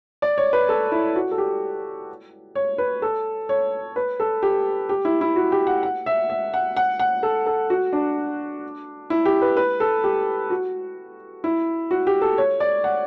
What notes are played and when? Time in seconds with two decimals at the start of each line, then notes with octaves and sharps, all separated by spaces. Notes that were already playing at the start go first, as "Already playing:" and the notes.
0.22 D5
0.38 C#5
0.53 B4
0.69 A4
0.92 E4
1.16 F#4
1.31 A4
1.38 G4
2.55 C#5
2.78 B4
3.02 A4
3.49 C#5
3.96 B4
4.20 A4
4.43 G4
4.89 G4
5.05 E4
5.21 E4
5.36 F#4
5.52 G4
5.67 F#5
5.83 F#5
6.06 E5
6.30 E5
6.54 F#5
6.77 F#5
6.99 F#5
7.23 A4
7.46 A4
7.70 F#4
7.93 D4
9.10 E4
9.26 G4
9.42 B4
9.57 B4
9.80 A4
10.04 G4
10.50 F#4
11.44 E4
11.91 F#4
12.07 G4
12.21 A4
12.38 C#5
12.60 D5
12.84 F#5